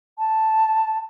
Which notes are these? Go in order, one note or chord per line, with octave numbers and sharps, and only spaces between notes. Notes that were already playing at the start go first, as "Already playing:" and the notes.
A5